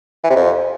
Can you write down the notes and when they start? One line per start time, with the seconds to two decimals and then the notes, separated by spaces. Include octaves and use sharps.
0.24 E3
0.30 C3
0.36 F2